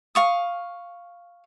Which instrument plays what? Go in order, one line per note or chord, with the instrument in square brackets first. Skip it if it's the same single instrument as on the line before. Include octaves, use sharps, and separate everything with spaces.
[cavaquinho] F5 C#6 D#6